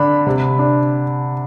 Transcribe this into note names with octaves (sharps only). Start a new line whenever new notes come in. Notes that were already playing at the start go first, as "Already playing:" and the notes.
Already playing: D3 D4 B5
C3
D4